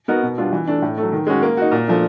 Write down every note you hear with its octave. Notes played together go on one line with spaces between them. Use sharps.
B3 D#4 F#4 A#4
B2
G3 B3 D4 F4
E3
A3 D4
A2
F#3 A3
D#3
G#3 C#4 F#4
A#3
D#4 F#4
A#2
F3 A3 D4